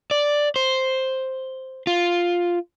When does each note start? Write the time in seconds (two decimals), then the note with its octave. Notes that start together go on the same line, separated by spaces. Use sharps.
0.11 D5
0.56 C5
1.87 F4